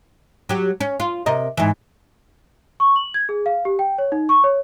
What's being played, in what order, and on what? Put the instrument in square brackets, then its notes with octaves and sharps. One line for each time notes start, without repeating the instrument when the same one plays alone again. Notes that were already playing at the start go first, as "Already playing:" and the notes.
[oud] F#3 G4
C#4
F4
C3 A#4 D#5
G#2 E3
[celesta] C#6
F#7
G#6
G#4
F5
G4
G5
C#5
D#4
C#6
C#5